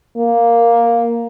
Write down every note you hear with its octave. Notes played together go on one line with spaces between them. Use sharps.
A#3